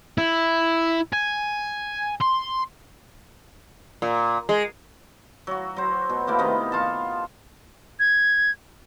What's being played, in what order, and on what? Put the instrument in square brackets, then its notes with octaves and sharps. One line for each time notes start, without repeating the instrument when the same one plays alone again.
[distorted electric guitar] E4
G#5
C6
[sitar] A#2
G#3
[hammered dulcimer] F#3 F#4
F#3 C5
B2
A3 A#3 E4
C3 D#3 A#3 B3
F4 A4 A5
[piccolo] G#6